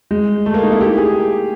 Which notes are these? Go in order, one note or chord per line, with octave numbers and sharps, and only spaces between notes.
G#3
A3
A#3
D#4
E4
G4
G#4